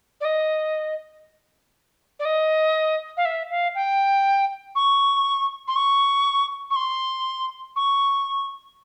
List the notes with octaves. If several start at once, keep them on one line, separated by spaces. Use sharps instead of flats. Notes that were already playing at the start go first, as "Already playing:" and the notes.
D5
D#5
D5
D#5
F5
E5
F5
G5
C#6
C6
C#6
C#6
C6
C#6